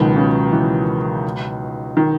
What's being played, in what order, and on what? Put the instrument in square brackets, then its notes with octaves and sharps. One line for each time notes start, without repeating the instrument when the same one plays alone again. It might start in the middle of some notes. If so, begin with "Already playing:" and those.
Already playing: [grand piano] C#2 B2 F#3 B3 [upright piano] D#3
[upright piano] C#3
E3
D#3